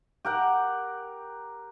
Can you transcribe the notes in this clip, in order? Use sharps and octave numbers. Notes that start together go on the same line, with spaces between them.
G4 A#4 F#5